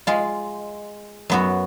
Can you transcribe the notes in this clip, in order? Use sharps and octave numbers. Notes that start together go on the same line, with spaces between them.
G#3 F4
F#2 B3 F#4